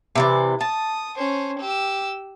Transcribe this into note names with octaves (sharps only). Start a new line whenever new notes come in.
C3 E3 D5
A5 D#6
C#4 C5
G4 E6